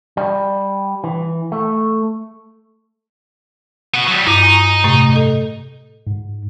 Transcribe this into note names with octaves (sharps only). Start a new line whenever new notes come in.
G3
E3
A3
B3 F#4
F#3 G3
G2 D#4 E4 D6
G#5 A#5 C#6
A2 C3 A3
A4 D#5
G#2